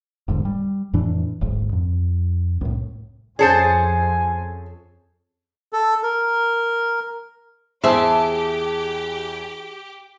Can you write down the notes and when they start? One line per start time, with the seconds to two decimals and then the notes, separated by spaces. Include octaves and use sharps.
0.28 E1 G#2 D3
0.45 G3
0.93 F2 A2 E3 D4
1.41 D1 G#1 G#2
1.72 F2
2.61 C2 A2
3.39 F2 C#4 G#4 A4 C5 G#5 A5 C#7
5.73 A4
6.03 A#4
7.84 E2 E3 G4 G#4 C5 E5 A5